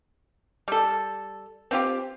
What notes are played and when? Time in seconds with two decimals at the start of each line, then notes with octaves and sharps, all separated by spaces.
0.68 G3 A4
1.71 C4 F4 G4